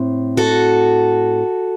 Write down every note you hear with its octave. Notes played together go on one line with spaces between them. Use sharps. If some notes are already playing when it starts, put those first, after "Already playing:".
Already playing: A2 C4
F#4 A4